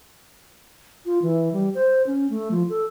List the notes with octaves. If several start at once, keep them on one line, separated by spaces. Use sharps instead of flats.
F4
E3
G3
C5
C#4
A3
F3
A4